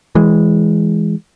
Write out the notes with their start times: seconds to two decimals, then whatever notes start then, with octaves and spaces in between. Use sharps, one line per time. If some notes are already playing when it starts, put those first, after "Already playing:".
0.15 E3 G#3